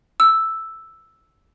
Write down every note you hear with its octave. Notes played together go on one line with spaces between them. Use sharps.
E6